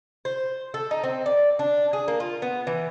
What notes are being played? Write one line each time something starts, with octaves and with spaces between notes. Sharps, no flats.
C5
A4
D#4
C4
D5
D4
G#4
A#3
F4
B3
E3